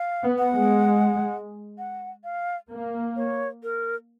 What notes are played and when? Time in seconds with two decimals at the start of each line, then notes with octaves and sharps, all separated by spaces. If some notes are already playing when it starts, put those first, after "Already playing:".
Already playing: F5
0.23 B3
0.38 F#5
0.54 G#3
1.78 F#5
2.24 F5
2.70 A#3
3.16 C#5
3.63 A#4